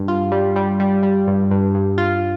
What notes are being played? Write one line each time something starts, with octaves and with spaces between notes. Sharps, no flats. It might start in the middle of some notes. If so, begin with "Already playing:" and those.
Already playing: G2
F4
G3
G3
G3
G3
G2
G2
G2
F4